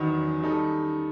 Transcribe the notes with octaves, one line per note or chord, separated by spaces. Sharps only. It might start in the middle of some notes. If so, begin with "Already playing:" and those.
Already playing: E2 D#3 F#3 B3 D#4
D#3 G3 D#4 A4